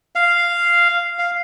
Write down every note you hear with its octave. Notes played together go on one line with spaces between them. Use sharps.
F5
F5